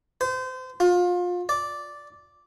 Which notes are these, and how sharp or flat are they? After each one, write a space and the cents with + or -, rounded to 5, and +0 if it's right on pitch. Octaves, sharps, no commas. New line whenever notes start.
C5 -30
F4 +25
D5 -5